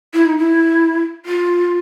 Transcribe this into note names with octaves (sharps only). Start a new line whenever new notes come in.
E4
D#4
E4
F4